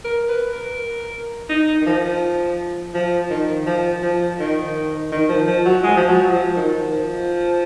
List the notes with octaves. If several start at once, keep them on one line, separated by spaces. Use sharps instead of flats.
A#4
B4
A#4
D#4
D#3
F3
F3
D#3
F3
F3
D#3
D#3
F3
F3
F#3
G#3
F3
F#3
F3
D#3
F3